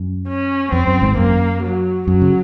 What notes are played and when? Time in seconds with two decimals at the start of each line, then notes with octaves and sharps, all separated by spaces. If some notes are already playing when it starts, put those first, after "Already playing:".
Already playing: F#2
0.28 C#4
0.72 F2 C4
0.87 F#2
1.01 G#1 G#2
1.17 F#2 A#3
1.63 F#3
2.08 F#2 F#3
2.22 C#3